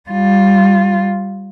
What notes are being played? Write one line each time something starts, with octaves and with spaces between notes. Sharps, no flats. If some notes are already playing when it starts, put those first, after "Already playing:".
G3 F4